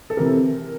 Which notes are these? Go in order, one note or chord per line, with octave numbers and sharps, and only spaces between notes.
A4
C3 E3 A#4